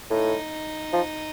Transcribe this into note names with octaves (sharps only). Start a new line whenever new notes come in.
A2 D#4
F3